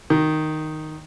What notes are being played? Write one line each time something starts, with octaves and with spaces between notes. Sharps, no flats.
D#3